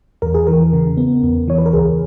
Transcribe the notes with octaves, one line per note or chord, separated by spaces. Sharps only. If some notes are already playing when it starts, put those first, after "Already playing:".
E2 A#4
G#4
E3 A#4
C#3
B3
E2
E3 C#5
B4
A#4
C#2 G#4